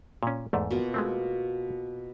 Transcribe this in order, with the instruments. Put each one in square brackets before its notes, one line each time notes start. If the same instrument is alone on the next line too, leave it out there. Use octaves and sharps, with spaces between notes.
[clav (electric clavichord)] A#2 C#4
E2 G#2 A3
[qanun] B2 A#3 F4
[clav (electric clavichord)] G#3 A3 C4